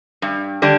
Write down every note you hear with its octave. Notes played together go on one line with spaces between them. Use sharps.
G2
D3 G3 D4